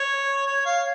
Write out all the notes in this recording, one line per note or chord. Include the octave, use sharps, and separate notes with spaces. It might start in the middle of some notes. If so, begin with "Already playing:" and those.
Already playing: C#5
C#5
F5